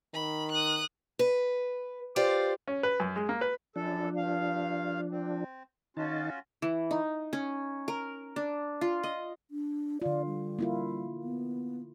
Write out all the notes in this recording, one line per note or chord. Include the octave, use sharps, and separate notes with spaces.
D#3 B5
D#6 F#6
B4
F4 G4 C5 D5 F5
C#4
B4
F#2
G#3
A#3
B4
F#2 F3 D4 A4
G2 F5
C4
D#3 C#4 D#4 F4 F#4 A5
E3
D#4
C#4
A#4
D4
F4
D#5
D4
D3 F4 D5
G3
A#3 E4 F4
B3